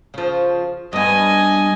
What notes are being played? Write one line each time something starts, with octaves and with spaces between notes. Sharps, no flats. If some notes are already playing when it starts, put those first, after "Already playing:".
C#3 F3
G2 B3 D#5 G#5